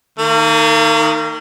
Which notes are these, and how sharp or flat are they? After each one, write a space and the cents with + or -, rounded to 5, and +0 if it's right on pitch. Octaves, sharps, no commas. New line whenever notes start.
D#3 +0 A#3 -40